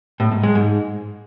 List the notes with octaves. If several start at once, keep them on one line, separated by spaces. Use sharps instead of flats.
A2
G#2
G#3
G#2